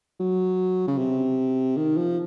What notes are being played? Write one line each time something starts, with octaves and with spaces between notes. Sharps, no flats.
F#3
C#3
C3
D#3
F3